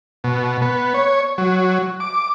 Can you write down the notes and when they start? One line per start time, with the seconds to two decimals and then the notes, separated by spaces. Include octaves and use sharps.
0.24 B2
0.62 B3
0.94 C#5
1.38 F#3
2.00 D6